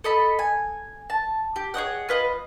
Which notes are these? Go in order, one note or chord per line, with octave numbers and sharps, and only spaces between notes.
A4 D#5 B5
G#5
A5
G4
G#4 C#5 D#5 F#5
F4 B4 D#5